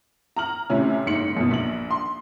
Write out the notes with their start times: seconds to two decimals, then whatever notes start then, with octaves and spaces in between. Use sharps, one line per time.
0.36 A#5 F6 F#7
0.70 A2 C3 C#4
1.06 F#1 G#2 C#7 F#7
1.37 F#2 B2
1.51 A#1 F#7
1.91 C6